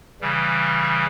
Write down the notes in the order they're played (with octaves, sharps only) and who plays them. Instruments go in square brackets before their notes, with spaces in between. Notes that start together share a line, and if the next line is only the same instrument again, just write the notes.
[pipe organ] C#3 E3 G3